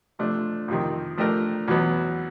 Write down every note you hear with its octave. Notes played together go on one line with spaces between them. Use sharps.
C3 F3 A3 D4
F2 C3 D#3
F3 A3 D4 G4 A#4
E2 B2 F#3 B3